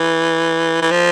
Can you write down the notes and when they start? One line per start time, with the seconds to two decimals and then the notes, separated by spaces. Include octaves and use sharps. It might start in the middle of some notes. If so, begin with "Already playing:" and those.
Already playing: E3
0.82 E3
0.91 F3